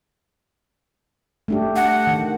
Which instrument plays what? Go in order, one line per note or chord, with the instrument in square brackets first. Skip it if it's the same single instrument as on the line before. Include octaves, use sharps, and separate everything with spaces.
[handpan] A3 D4 G4
[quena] F#5
[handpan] D#3